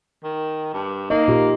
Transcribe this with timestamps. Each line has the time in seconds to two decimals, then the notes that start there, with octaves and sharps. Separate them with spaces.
0.23 D#3
0.73 G2
1.10 A#3 D#4 D#5
1.28 A#2 F4 G4